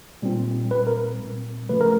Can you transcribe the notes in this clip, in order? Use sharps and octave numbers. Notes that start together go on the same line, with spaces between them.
A#2 G3 C4
A#2 G3 C4 B4
A#4
A#2 G3 C4
C#3 F3 A3 B4
A#4